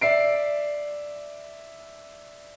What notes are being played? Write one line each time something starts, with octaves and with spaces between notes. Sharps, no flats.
D5 E5 C7 D7